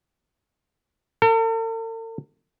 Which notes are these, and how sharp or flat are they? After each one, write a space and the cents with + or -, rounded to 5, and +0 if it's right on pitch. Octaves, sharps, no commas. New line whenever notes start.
A4 +45